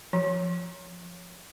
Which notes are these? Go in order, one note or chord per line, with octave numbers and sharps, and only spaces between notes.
F3